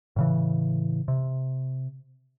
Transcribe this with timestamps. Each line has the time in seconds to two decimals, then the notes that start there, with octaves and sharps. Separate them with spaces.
0.16 A2 C#3 E3
1.08 C3